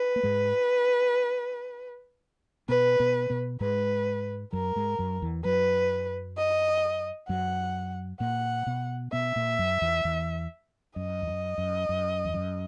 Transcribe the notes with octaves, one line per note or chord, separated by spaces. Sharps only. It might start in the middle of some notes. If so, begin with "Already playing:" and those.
Already playing: B4
A#3
G#2 G#3
B2 B3 B4
B2 B3
B2 B3
G#2 G#3 B4
F#2 F#3 A#4
G#2 G#3
F#2 F#3
E2 E3
F#2 F#3 B4
D#5
F#2 F#3 F#5
A#2 A#3 F#5
B2 B3
B2 B3 E5
A#2 A#3
F#2 F#3
E2 E3
E2 E3
F#2 D#5
E2
F#2
F#2
F#2
E2
F#2